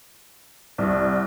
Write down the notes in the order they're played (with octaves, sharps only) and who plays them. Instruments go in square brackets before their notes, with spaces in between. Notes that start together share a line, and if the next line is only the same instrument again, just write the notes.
[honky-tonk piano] C2